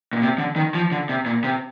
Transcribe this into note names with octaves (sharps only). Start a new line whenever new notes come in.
A#2
C3
D3
D#3
F3
D3
C3
A#2
C3